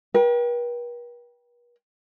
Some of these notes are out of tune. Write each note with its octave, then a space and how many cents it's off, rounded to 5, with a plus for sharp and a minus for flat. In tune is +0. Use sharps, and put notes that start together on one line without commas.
B4 -45 G5 +0